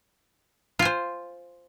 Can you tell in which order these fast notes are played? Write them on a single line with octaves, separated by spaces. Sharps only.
F4 G#5 C5